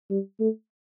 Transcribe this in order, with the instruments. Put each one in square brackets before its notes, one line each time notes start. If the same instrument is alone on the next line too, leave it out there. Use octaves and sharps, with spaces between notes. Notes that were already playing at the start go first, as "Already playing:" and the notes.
[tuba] G3
A3